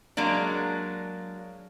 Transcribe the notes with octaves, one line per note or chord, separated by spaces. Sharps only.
F#3 G#3 A#3 D4